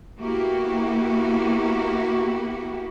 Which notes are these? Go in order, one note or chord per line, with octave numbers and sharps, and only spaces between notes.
A#3 B3 E4 F#4 G4